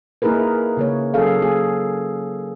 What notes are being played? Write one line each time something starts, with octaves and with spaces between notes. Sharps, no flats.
A#3 D#4 E4 G#4 A#4 B4
C#3 A#3 C#5
F#3 C#4 G#4 A4 F5
A#3 G#4